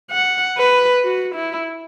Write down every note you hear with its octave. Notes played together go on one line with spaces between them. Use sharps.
F#5
B4
F#4
E4